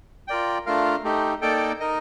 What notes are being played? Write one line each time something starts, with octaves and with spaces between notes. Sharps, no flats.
F4 A#4 D5 G5
A3 D4 F4 A#4 F5
A3 D#4 G4
A#3 D#4 A4 D5 G5
D#4 A#4 D#5